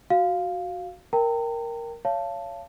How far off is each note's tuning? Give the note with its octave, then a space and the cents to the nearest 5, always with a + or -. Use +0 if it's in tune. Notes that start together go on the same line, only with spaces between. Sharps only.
F#4 +0 F5 +0
A#4 +0 G5 +0 A#5 -40
C#5 +15 F5 -30 A5 +0